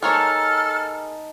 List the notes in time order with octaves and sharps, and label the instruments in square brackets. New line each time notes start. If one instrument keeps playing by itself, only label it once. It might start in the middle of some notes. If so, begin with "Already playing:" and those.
[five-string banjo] G#3 A#3 C#5 [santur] D#4 A5 B5 [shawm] A4 [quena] F6